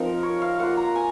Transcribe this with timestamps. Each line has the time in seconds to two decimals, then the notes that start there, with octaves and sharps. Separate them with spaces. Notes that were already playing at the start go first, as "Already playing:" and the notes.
Already playing: F3 C4 D#4 A#4
0.23 C#5
0.42 F5
0.60 A#3 F4 F#5
0.77 A#5
0.95 G#5